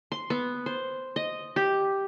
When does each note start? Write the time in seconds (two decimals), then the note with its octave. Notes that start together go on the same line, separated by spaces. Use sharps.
0.12 C6
0.30 B3
0.66 C5
1.16 D#5
1.56 G4